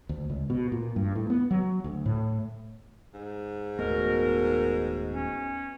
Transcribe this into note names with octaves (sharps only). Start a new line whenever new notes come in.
D2
C#2
B2
A#2
G2
A2
B3
F#3
D2
A2
G#2
D#1 F2 B2 A3 A#4 C#5
C#4